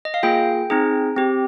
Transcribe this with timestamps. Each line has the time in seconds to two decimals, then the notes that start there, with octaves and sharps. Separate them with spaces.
0.05 D#5
0.14 F5
0.23 A#3 F4 G#4 G5
0.70 C4 D#4 G#4
1.16 C4 G4